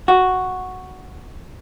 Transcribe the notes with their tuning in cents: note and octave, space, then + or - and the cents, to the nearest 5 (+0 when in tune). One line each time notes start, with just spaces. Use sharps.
F#4 +0